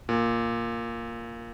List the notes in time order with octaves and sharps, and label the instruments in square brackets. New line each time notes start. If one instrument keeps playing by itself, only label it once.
[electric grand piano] A#2